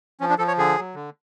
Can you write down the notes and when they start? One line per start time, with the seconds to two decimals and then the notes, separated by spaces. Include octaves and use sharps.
0.20 F3 C#4
0.29 D4
0.38 F3 A4
0.48 C#5
0.58 D3 G#4
0.77 F#3
0.95 D3